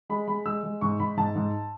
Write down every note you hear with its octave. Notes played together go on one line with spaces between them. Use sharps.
G#3 B5
G#3 B5
G#3 E6
G#3
G#2 C#6
G#2 B5
G#2 A5
G#2